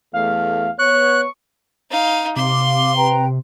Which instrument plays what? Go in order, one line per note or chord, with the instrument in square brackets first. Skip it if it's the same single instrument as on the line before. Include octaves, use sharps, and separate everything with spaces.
[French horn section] E2 A3 [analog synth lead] F5
[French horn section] B3 C#5 [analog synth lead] C#6 [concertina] F#6
[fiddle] D#4 F5
[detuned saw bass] C3 [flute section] F5 D6 [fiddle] C6
[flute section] B4 G5 A#5